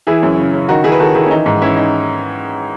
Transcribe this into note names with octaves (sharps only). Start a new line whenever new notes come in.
E3 E4 G#4
F#2
C#3
C#3
D#3 D#4 F#4
D#3 E4 G#4
B4
D#3 F#4 A4
D#3 E4 G#4
C#4
E3 D#4
G#2 D#4
E3 C#4 E4
D#4